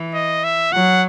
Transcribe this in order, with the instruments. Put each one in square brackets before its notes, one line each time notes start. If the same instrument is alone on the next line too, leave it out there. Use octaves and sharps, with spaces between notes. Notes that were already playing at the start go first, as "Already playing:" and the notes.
Already playing: [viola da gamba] E3
[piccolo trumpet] D#5
E5
[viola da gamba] F#3 [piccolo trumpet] F#5